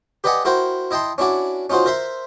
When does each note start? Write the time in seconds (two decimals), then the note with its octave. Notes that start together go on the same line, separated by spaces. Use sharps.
0.24 G4 B4 D5 D#5 F#5 G#5
0.45 E4 F#4 A#4 C5 G5
0.91 E4 D#5 G5 A5 C6
1.18 C#4 D4 E4 F#4 D5
1.70 C#4 D#4 F4 F#4 C5
1.86 A#4 C5 E5 C6